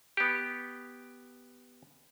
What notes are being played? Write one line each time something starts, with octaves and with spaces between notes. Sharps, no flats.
B3 G4